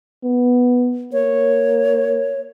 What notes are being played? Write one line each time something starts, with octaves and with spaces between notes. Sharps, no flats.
B3
A#3 C#5